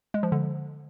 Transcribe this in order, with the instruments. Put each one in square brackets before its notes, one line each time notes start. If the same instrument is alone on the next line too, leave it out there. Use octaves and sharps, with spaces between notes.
[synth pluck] G#3
F3
D3